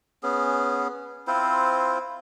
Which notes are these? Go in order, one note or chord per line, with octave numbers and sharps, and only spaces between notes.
B3 C#4 G#4
C4 E4 F4 C5